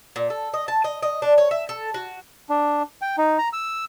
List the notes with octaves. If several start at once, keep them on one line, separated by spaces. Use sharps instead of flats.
A#2
A4
D#5
A5
D#5
D#5
D4
C#5
E5
A4
F#4
D4
G5
D#4
A#5
E6